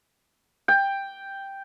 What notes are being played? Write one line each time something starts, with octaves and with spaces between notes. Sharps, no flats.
G5